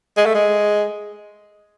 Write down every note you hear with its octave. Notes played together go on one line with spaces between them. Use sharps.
G#3
A3
G#3